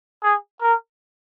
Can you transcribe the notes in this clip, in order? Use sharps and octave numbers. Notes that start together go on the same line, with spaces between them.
G#4
A#4